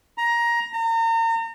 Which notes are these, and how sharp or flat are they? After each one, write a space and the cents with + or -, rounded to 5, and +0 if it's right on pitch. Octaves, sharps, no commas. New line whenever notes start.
A#5 +15
A#5 -35